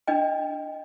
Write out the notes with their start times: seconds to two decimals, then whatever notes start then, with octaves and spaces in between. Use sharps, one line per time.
0.07 D4 D#5 G5